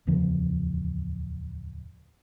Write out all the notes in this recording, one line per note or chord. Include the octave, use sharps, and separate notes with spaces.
D1 E2 C#3 F3